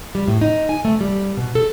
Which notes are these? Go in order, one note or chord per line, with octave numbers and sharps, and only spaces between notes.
G3
A2
D#4
G#5
A3
G3
B2
A4